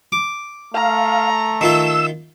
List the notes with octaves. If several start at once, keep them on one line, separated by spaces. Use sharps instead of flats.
D6
A3 F5 A#5
D#3 F4 E5 E6